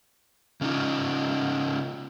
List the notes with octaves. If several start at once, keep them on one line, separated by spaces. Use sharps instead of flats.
C#3 C#4 D#4 F4